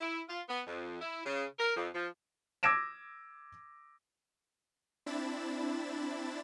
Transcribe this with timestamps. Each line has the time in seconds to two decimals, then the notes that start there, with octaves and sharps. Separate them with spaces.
0.01 E4
0.29 F4
0.49 B3
0.67 F2
1.01 E4
1.25 C#3
1.59 A#4
1.76 F2
1.94 F3
2.63 D6 E6 G#6 A#6 D7 E7
5.06 C4 D4 E4 B5 A6 E7